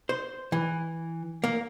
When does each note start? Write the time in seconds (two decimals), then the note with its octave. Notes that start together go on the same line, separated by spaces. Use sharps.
0.09 C5
0.52 E3
1.44 A#3